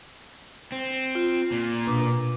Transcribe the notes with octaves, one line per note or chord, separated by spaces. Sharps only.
C4
F4
A#2
B2 D4 D6